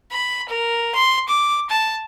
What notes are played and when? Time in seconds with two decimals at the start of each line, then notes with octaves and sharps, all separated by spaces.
0.11 B5
0.49 A#4
0.95 C6
1.28 D6
1.69 A5